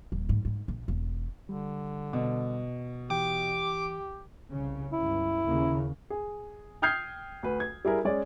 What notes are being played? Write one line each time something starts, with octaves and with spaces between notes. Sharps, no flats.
D#1
G#2
G#2
A#1
E1
D3 G3
B2
E3 G4 G5 D6
C2 C#3
G1 C#2 E4
D#2 C#3 A#3
G#4
G5 D#6 F6 G6 G#6 C7
D2 B4
G#6
G3 E4 G#4 A#4
G#3 C#4 D5